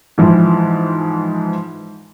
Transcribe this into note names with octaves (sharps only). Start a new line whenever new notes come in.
G#2 E3 F3